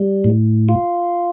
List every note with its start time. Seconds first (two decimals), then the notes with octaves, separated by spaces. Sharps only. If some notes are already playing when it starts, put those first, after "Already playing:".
Already playing: G3
0.24 A2
0.69 F4